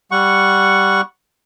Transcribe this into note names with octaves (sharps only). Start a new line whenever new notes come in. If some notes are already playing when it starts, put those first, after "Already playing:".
G3 F#5 C#6